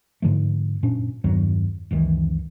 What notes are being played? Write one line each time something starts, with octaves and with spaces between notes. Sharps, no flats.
G#2 D3 F3 A3
F#1 A#2 C#4 D4
E2 G2 D#3 F#3
F#1 C#2 D#3 E3